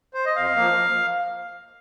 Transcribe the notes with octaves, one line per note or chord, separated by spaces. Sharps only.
C5
D#5
F2 F5
F3 A#3